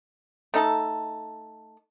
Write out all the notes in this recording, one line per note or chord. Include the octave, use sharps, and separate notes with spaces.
A3 D#4 A4